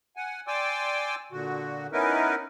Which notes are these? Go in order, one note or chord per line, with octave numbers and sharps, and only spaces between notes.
F#5 G#5
D5 G5 G#5 C6 D6 E6
A#2 D3 F#4
B3 C#4 D#4 E4 A#4 B4